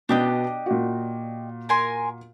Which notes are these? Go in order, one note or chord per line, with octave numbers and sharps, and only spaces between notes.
B2 B3 D4 G4 D#5
A#2 F#4
A#4 G#5 C6